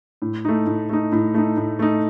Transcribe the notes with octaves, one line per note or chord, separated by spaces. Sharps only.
A2
A3 D#4
A2
A3 D#4
A2
A3 D#4
A2
A3 D#4